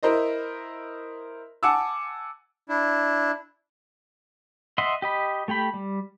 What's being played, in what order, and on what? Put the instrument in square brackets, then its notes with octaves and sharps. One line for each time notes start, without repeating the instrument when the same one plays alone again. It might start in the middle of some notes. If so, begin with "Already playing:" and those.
[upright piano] E4 A#4 C5 D#5
F#5 G#5 A5 D6 E6
[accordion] D4 E4
[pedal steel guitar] D#5 E5 F#5 C6
G4 D#5 B5
A3 G4 G5 B5
G3